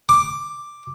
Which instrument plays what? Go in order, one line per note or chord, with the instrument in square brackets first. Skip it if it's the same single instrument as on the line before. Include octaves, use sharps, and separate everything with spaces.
[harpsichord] D6